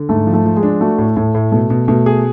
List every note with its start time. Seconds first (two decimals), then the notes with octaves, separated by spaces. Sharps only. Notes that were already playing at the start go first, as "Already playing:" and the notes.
Already playing: D3
0.09 G#2 A3
0.27 F3
0.34 A3
0.45 F3
0.56 G#3
0.63 D4
0.80 A3 F#4
0.98 A2
1.16 A2 A3
1.35 A2
1.52 B2 A3
1.70 B2
1.88 B2 A3
2.06 G#4